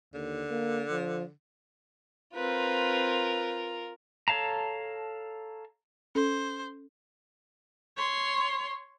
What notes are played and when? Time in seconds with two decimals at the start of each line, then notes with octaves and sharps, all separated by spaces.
0.14 D#2 D3
0.50 A#3
0.91 F3
2.35 C4 F4 A#4 B4
4.28 A4 C#5 F5 A5 A#5
6.15 C#4 A4 C5
7.97 C#5 C6